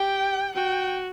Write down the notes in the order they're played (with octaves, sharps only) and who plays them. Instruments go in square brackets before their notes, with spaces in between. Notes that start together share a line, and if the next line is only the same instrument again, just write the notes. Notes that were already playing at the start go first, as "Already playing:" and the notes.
Already playing: [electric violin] G4 [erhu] G5
[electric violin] F#4 [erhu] G5